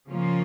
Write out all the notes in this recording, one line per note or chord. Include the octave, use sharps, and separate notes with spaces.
C#3 F3 A#3 C#4 F4